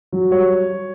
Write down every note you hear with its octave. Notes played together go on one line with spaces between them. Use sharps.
F#3
G3 C#5